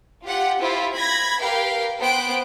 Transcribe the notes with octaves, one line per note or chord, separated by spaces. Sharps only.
F4 G4 F#5
E4 F4 G4 C5
B5 G#6 A#6
G4 A#4 B4 F5 G5
B3 C5 G5 F#6 D7